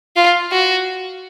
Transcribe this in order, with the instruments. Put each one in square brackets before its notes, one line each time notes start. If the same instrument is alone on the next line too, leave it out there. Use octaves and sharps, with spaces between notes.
[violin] F4
F#4